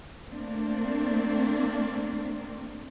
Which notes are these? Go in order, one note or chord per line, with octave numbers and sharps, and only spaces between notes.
A3 A#3 C4 D4